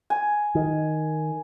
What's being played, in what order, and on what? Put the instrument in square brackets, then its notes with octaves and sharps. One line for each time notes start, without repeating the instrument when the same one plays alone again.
[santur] G#5
[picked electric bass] D#3